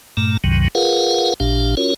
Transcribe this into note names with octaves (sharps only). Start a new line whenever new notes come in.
G2 A#2 A3 A#5
C2 F#2 C3 D#3 F#3
F4 G#4 A#4 B4 F5 F#5
A1 A#2 D4 G4 F5
C#4 F4 F#4 A#4 C#5